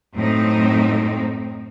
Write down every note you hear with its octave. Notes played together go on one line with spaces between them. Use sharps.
F#2 A2 C4 D#4